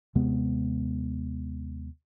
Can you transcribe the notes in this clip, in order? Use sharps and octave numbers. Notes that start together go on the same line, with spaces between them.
D#2 C3 G#3 B3